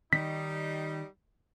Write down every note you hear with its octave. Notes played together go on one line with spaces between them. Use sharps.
D#3 G3 D#4 B6